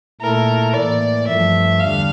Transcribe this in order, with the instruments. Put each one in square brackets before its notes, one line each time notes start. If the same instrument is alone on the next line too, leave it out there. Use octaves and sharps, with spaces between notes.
[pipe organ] A#2 A3 E4 A4 [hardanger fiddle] A#4
[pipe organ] A2 E3 A#3 [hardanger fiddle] D5
[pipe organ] G2 F3 A3 [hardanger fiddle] E5
[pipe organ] E2 D3 G3 D4 [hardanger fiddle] F5